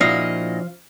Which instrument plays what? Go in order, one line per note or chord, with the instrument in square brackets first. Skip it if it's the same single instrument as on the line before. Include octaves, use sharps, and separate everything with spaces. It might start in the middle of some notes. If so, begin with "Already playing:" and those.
[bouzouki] A#2 D#5 [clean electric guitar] F3 F5 [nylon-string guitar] D4 E4 F#4